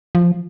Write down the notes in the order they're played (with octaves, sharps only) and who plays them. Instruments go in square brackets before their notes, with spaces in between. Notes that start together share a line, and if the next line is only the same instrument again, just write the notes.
[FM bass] F3